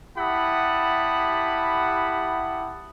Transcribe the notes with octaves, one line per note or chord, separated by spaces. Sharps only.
E4 G4 F#5 A5 B5 D#6